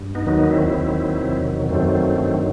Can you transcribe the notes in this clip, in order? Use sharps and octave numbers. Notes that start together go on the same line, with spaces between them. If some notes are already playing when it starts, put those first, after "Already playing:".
Already playing: G2
B3 D#4
D#2 D#3 F#3 B3 D#4
B3 D#4
C4 E4
C4 E4
D#2 D#3 F#3
E2 C3 D#3 F#3
F#2 D#3 F#3 A3 C4
G2 D#3 F#3